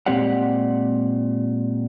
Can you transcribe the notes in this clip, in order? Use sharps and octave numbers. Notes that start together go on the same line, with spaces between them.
A#2 G#3 C4 G4 D5 F#5